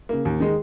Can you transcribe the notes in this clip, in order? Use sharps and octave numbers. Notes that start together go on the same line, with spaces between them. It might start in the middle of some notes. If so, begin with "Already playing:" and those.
C#3 A#3
D#2
D#3 G#3 D#4